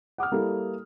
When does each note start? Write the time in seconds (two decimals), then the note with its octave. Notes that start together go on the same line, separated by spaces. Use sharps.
0.18 F#5 D6 D#6 F6
0.32 G3 A#3 E4 A4